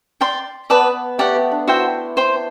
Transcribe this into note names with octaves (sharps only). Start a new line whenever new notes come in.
D5 G5 C6
B3 B4 D5 A5 D6
A3 G4 D5 F#5
B3
D4
E4 F#4 C5 E5 G5
C5 G5 C6